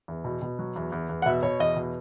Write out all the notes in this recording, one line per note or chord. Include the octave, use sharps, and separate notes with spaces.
E2
B2
B2
F#3
E2
E2
E2
F#5
B2 E5
B2 C#5
E2 D#5
B2